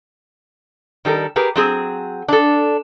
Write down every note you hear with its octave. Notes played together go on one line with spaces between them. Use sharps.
D#3 G3 A4 A#4
G4 G#4 A#4 B4
F#3 C4 G#4
D4 A4